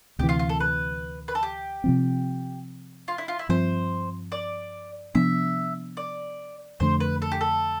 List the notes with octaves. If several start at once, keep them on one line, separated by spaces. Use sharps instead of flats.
D2 C3 E3 G4
F4
F4
A4
B4
B4
A4
G4
C3 F3 C4
F4
E4
F4
E4
G2 F3 C4 C5
D5
C3 F3 B3 D4 E5
D5
F2 D3 A3 C5
B4
A4
G4
A4